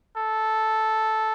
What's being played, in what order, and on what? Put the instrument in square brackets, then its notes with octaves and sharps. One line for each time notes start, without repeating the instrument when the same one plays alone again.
[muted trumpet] A4